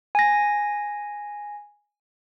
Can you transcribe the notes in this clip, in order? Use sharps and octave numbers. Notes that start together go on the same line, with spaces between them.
G#5 A#6